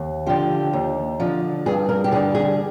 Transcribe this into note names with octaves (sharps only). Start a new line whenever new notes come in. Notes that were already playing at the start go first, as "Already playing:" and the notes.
Already playing: D#2
D3 F3 G4
D#2
D3 F3
G2 G#4
A#4
G4
D3 G3 G#4
G#4